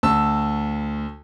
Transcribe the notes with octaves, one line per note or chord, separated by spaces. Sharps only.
D2 A5 E6